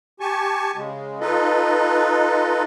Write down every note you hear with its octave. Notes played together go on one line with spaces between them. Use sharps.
G4 G#5 A5 C#6
C#3 G#3
D#4 F4 A4 B4 D#5